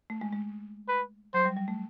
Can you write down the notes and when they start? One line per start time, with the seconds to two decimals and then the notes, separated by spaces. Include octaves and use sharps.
0.10 A3
0.21 G#3
0.33 G#3
0.88 B4
1.34 F#3 C5
1.45 G3
1.57 G3
1.68 A3